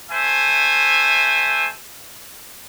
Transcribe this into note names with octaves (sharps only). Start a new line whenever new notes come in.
A3 C5 E5 G#5